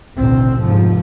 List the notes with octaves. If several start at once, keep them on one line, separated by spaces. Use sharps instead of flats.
A1 D2 B2 C4
F1 G#2 F3